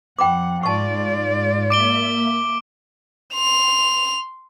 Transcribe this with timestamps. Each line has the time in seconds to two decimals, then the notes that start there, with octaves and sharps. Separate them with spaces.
0.19 F2 F#5 G5 B5 D6
0.63 G#2 F4 D5 A5 C#6
1.70 A#3 E5 D6 D7 G7
3.34 C6 F7